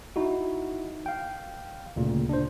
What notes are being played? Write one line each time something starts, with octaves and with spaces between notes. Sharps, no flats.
D#4 E4 F#4
F5 G5
D2 A#2 C#3
D4 C5